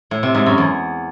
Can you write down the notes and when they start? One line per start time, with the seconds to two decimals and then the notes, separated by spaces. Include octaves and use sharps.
0.11 A2
0.23 C3
0.35 G#2
0.46 F#2
0.58 E2